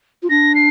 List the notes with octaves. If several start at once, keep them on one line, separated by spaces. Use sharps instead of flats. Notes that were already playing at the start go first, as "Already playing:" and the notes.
F4
D4 A#6
C7